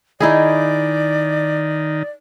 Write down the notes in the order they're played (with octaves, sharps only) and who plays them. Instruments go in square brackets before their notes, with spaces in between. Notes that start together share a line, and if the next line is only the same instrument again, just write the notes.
[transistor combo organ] D#3 [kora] D#4 E4 G#4 [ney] D5